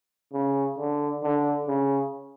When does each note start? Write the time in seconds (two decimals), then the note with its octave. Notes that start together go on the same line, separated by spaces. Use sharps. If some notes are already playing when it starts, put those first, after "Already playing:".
0.33 C#3
0.78 D3
1.23 D3
1.68 C#3